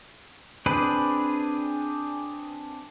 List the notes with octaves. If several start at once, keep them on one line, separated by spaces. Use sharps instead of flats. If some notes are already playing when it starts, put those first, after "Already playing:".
C4 D4 G#4 B4 D5